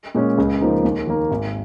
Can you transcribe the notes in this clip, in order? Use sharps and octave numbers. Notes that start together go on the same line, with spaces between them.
A#2 G#3 C#4
C#2
C#3 F3 A#3 D#4
D#2
D#3 A#3
G#1